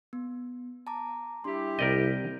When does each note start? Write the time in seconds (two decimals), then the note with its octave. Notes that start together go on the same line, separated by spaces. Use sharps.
0.13 B3
0.87 A5 A#5 D6
1.44 G3 D4 E4 G4 C6
1.79 C2 A#4 D5 D#5 G6